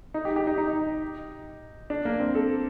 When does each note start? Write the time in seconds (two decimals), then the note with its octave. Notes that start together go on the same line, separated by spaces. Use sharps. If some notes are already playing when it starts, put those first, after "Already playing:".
0.14 D#4
0.25 G4
0.36 G4
0.47 D#4
0.58 D#4
1.90 D4
2.05 A#3
2.20 C4
2.35 A4